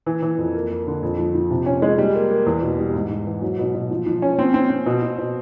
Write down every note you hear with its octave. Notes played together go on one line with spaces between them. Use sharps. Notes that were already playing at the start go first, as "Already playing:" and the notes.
E3
E3
F2
A#3
A#3
D3
F2
F3
F3
C3
C#4
G#3
G3
A#3
A#3
E2
B2
G3
G#2
G#2
E3
F#3
B2
B2
F3
F3
C#4
C4
C4
C4
B2
B2
B2